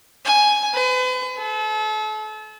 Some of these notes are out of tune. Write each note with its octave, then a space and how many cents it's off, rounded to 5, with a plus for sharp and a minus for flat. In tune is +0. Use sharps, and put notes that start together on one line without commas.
G#5 +5
B4 +40
A4 -35